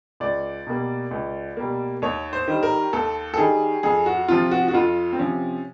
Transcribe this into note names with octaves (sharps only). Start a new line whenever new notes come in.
C#2 D5
B2 G3 A#3
C#2
B2 G3 A#3
D#2 C#5
C5
D#3 G3
A#4
D#2 A4
A4
D#3 G3 G#4
F2 G#4
F#4
C3 F3 F4
F#4
F#4
F2 F4
C4
C3 F3 C#4